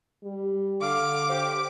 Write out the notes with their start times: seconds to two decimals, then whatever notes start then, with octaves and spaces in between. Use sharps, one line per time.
0.24 G3
0.82 D3 F5 D6
1.30 G4 C5